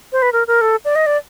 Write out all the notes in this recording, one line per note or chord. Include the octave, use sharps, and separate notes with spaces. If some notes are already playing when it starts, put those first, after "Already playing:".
C5
B4
A#4
A#4
A4
D5
D#5
D5